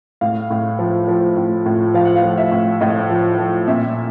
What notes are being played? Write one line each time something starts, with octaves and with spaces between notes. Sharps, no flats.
A2 F5
A2
F3
F3
A2
A2
F3 F5
F#5
F5
F3
E5
A2
A2 D#5
F3
F3
A#2 E5